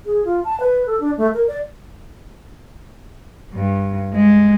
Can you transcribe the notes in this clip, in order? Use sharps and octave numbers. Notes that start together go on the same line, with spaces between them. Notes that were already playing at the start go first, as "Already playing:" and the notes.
G#4
F4
A5
B4
A4
D4
A3
A#4
D5
G2
G#3